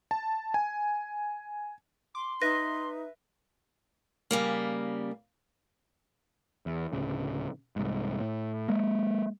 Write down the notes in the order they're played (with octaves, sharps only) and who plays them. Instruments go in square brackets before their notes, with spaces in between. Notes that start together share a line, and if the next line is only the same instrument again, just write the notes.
[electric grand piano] A5
G#5
[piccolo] C6 [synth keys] D6
[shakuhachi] D#4 [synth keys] B4 E5 [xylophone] A#6
[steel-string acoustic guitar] C#3 G3 A#3
[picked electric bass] E2
D1 C#3
C2 G#2
A2
G#3 A#3